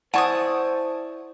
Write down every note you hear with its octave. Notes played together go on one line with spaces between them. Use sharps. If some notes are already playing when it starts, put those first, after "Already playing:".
E4 C5 D5 F#5 G#5 A5 C#6 D#6